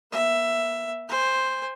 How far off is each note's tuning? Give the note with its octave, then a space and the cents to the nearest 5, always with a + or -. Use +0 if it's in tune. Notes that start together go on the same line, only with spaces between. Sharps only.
B3 -40 E5 +10
C5 +0 G#5 -40